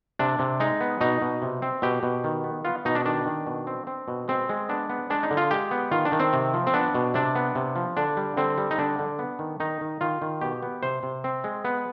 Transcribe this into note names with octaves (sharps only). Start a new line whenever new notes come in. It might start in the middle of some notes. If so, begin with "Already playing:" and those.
C3 D4
C3
G#3 D#4
B3
B2 D#4
B2
C3
C4
B2 G4
B2
D#3
B3
B3 F4
B2 D#4
D4
D#3 D4
D#3
B2
C4
C4
B2
G#3 C4
G#3
B3 D4
B3
G#3 D4
D#4
D3
F4
G#3 G4
B3
D#3 F4
D4
D#3
C4
C3
F3
C4
B3 D4
B2
C3 D4
B3
C3
F3
D3 D4
G3
D3 C4
G3
D#4
D3 D4
D3
B3
D#3
D#3 D#4
D#3
D#3 F4
D#3
B2 G4
B3
C3 C5
C3
C4
G#3
B3